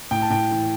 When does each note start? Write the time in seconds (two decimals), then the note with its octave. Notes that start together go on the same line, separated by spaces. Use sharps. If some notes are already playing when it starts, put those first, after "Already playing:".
0.11 A2 G5
0.22 A5
0.30 A2 G5
0.51 E3